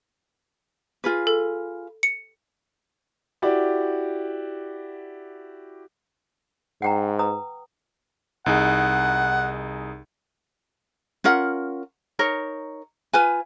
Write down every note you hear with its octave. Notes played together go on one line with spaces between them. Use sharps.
F4 G#4 B4
A4
C#7
E4 F#4 G4 D5
G#2 F#5 G5 A#5
B4 A#5 D#6
C2 D#4 G#4 F#5
C#4 F4 A#4 F#5
D#4 A#4 C#5
F4 B4 G#5